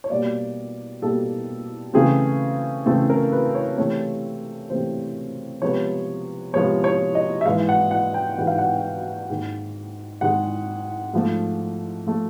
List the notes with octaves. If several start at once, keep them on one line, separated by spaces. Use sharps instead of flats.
C#5
B2 G3 A#3 D5
B2 G3 A#3 A4
C#3 E3 A3 C4 G#4
C#3 E3 A3 C4 A4
A#4
B4
C#5
C3 E3 A3 C4 C#5
C3 E3 A3 C4 C5
C3 F3 G#3 B3 C#5
C3 F3 G#3 B3 C#5
C#5
D#5
E5
G#2 E3 G#3 F5
F#5
F#5
G5
G#2 E3 G#3 F#5
F5
F#5
G#2 D#3 G#3
G#2 D#3 G#3 F#5
G#2 F3 A3
F3 A3